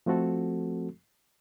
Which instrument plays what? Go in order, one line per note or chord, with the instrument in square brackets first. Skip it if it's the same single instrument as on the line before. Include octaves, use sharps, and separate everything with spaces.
[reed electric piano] F3 A3 C4 F#4 A4